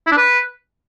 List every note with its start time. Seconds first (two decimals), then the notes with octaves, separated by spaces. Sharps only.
0.07 E4
0.12 D4
0.17 B4